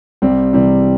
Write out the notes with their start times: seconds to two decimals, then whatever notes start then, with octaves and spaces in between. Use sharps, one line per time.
0.22 C2 G3 C4
0.53 C3 E3 G3 C4